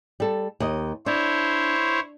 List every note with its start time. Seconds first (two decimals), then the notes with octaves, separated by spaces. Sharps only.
0.20 G3 A4
0.60 D#2 D#5
1.06 D4 E4 C5 C#5